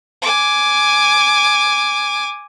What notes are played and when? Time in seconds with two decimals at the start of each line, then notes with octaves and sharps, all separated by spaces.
0.22 G#5 D6